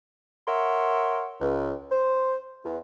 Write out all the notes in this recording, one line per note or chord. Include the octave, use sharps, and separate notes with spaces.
A#4 C#5 E5 F#5 C6
C#2
C5
E2